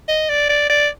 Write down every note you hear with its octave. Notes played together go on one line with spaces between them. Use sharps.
D#5
D5
D5
D5